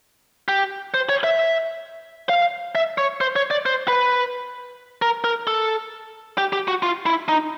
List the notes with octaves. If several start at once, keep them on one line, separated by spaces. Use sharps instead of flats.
G4
C5
C#5
E5
F5
E5
C#5
C5
C#5
D5
C5
B4
A#4
A#4
A4
G4
G4
F#4
F4
E4
D#4